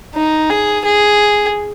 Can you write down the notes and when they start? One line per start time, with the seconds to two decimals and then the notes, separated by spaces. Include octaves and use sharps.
0.15 D#4
0.50 G#4
0.85 G#4